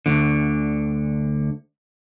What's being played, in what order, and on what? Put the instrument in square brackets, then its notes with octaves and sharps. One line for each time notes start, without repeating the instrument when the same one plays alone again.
[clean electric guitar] D2 D3